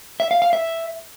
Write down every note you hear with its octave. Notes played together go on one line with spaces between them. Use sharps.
E5
F5
F5
E5